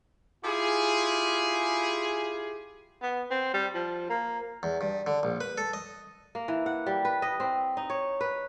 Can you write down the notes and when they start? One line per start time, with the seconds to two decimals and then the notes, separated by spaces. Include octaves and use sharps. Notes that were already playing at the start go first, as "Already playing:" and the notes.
0.44 E4 F4 G4 G#4
3.02 B3
3.30 C4
3.54 G3
3.74 F3
4.10 A#3
4.63 E2
4.81 G2
5.07 D3
5.23 A#1
5.41 B4
5.58 A4
5.73 D#5
6.35 A#3
6.48 E3
6.66 F#5
6.87 G3
7.05 B4
7.22 D#5
7.40 C4
7.77 D#4
7.90 C#5
8.21 B4